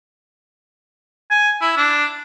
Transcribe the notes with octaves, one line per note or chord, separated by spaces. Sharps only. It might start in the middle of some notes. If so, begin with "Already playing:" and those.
G#5
E4
D4